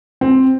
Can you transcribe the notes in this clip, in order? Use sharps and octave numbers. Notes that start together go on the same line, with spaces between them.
C4